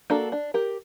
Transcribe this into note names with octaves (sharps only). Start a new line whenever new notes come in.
A#3 D4 F#4 A4
D4
G4 A#4